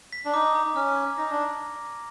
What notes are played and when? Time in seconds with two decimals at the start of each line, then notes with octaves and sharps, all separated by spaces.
0.13 B6
0.25 D4
0.34 D#4 D6
0.55 A#5
0.75 C#4 F6
0.96 G#6
1.18 D#4 A#6
1.30 D4